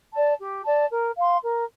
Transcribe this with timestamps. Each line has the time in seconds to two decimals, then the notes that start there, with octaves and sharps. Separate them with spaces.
0.14 D5 A5
0.39 G4
0.65 D5 A5
0.91 A#4
1.17 F5 C6
1.43 A#4